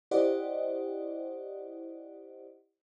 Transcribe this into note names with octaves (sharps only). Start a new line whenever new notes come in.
E4 G4 C5 D5 D#5 F#5